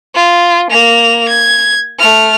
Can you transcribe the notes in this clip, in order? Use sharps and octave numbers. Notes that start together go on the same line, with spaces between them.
F4
A#3 F7
G#6
A3 F6